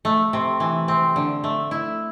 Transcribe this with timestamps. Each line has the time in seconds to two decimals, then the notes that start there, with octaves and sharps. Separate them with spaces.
0.05 A3
0.33 C3
0.60 E3
0.88 C4
1.16 D3
1.44 A3
1.71 E4